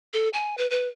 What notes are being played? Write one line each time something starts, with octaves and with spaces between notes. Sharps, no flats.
A4
G#5
B4
B4